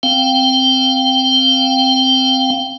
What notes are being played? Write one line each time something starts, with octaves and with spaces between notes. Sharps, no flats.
C4 F5 G5